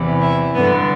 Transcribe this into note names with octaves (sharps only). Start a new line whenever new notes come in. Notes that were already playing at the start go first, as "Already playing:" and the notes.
Already playing: E2 C3 E3
E4
G2 D3 B3